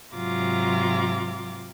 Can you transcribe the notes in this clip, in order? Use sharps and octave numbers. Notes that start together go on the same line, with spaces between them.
G#2 C3 F#3 F4 A#5 D6